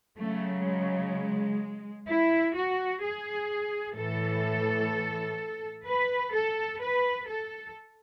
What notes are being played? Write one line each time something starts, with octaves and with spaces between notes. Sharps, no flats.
C#3 F#3 A3
G#3
E4
F#4
G#4
A2 E3 A4
B4
A4
B4
A4